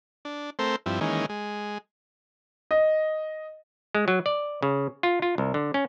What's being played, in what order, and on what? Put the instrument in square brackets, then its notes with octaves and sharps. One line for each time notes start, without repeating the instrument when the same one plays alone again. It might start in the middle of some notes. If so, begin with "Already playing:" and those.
[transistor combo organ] D4
A3 C4 A#4 C5
G2 F3 C4 E4
D#3 E3 G#3 A#3 C#4
G#3
[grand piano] D#5
[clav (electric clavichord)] G#3
F#3
D5
C#3
F4
F4
C2
D3
C#4